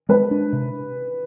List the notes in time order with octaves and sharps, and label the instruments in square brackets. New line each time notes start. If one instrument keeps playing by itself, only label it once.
[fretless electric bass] G#3 [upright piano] B4
[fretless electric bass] D4
C3